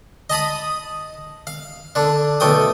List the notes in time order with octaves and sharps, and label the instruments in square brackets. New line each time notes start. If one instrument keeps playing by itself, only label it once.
[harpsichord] D#5 A5 B5 D#6
F5
D3 D4
B1 A3 G5 D#6